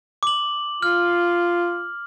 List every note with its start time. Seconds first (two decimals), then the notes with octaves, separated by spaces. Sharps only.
0.23 D6 F#7
0.83 F4 F6